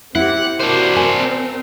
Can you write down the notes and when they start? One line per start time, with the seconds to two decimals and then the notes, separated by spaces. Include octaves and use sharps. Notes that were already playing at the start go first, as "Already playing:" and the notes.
0.15 C4 E4 G4 F#5
0.60 C4 D4 F#4 A#4 C5
0.96 C4 A#4 G#5